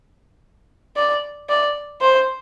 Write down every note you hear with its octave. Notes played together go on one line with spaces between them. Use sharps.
D5
D5
C5